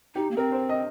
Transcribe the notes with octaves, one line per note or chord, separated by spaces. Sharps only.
D#4 G4
A#3
C4 A#4
C5
D#5